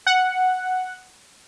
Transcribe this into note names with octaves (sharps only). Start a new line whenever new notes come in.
F#5